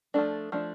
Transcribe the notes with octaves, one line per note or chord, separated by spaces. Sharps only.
F3 A3 D4
F3 A3 D4